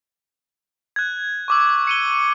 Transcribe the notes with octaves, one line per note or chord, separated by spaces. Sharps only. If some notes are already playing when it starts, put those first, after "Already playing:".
F#6 G#6
C#6 D6 E6
C#7 D#7 G7